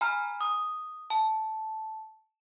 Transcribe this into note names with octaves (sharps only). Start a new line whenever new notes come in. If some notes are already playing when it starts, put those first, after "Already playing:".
G#5 A#5 B5 F6
D#6
A5